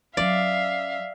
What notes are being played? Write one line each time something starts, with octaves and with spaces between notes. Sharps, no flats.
F#3 C#4 D5 E5 F5